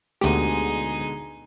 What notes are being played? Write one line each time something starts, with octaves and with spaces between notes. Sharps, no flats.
D2 B2 D3 G#3 D#4 G4 G#4